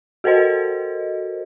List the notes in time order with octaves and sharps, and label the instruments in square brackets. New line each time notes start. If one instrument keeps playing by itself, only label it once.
[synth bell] F#4 A4 A#4 C5 D#5